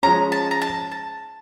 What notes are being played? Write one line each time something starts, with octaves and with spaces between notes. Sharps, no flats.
F3 G#3 C#4 A#5
A5
A#5
A5
A5